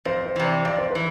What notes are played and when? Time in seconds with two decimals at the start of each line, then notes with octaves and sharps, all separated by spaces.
0.05 F2 C5
0.26 C5
0.36 C3 E3
0.45 D5
0.65 F2 D5
0.78 C5
0.91 E3 B4